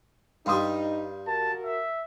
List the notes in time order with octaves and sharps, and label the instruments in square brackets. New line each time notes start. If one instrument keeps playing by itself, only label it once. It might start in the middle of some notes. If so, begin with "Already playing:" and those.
[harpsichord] G2 G3 [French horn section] D#4 [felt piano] F5 C6 D#6
[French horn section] F#4 A#4 [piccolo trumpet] A5
[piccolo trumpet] E5